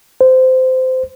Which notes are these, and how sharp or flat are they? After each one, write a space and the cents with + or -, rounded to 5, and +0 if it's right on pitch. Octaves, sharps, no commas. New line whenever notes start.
C5 -20